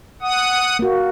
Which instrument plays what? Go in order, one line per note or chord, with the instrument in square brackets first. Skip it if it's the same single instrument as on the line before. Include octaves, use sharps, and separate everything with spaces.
[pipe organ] F#5 D#6
[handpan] A#3 F#4